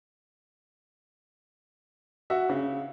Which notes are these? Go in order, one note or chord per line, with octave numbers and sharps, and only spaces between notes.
F#4 E5
C#3